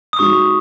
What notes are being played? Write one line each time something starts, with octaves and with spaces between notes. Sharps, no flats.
D#6
G#3 D#4 F#4 C#6